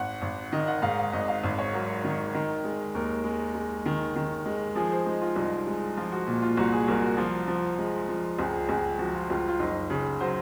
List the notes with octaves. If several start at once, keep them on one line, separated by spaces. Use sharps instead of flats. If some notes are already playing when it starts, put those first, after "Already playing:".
Already playing: G#1 F#5
G#1
D#3 D#5
F#5
G#2 F5
F5
G#1 D#5
F5
G#1
C#5
F#3 A#4
D#3
D#3
G#3
D#2 A#4
G#3
G#3
D#3
D#3
G#3
F3 G#4
C5
G#3 D#4
F4
C2 D#4
G#3
F3 F4
F#4
A#2
F4
C2 F#4
G#4
C2 A#4
F#4
F3 F4
F3
G#3
F3
C#2 G#4
C#2 G#4
F3 F#4
F4
C#2 F4
F4
F#1 D#4
C#3
F#3 C5